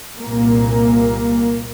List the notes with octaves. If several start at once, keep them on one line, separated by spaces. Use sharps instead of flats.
C2 A#2 A#3